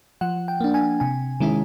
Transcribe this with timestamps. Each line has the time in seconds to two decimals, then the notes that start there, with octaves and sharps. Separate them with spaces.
0.21 F3 F#5
0.48 G5
0.60 A#3 D4
0.74 G#5
1.00 C3 G#5
1.40 D#3 G#3 C#4 E4